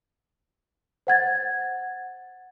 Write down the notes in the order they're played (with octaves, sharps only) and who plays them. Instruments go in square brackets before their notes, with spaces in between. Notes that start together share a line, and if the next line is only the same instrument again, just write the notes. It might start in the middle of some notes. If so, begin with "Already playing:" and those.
[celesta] C5 F#5 G#6 A6